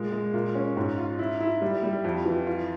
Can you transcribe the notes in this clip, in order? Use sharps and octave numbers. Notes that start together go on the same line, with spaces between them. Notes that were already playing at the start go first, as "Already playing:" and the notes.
Already playing: A#2 G#3
G#3
A#2
C#4
G#2
F4
E4
E4
G3
G3
F2
E3
F4